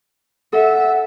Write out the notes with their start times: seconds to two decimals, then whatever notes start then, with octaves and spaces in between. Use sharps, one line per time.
0.53 A4 E5 F#5